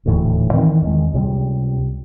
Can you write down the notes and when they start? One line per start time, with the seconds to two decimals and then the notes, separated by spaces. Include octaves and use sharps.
0.05 D#1 D2 A2 E3
0.53 D#3 E3 C4
0.82 E2 D#3 G#3
1.14 C#2 C3 G3